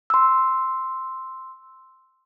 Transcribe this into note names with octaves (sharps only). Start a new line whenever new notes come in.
C6 E6